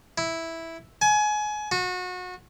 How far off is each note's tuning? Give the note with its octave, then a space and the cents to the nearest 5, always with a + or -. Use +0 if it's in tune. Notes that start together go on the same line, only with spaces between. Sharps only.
E4 -5
G#5 +25
F#4 -30